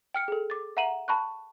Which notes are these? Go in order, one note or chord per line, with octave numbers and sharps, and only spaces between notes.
G5 F6 C#7
G#4 A4
D6 A6
E5 F#5 A#5 D#7 E7 F#7
A5 B5 C#6 F#6